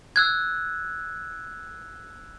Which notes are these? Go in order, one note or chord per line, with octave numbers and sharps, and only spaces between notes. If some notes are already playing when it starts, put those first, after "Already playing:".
E6 F#6 G#6